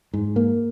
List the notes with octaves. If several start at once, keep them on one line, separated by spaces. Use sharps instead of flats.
G#2
A#3